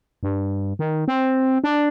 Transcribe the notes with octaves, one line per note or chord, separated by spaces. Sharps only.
G2
D#3
C4
D4